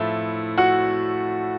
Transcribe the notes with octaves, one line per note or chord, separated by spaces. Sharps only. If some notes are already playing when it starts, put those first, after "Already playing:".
Already playing: A2 F3 A3 E4
F#4 F#5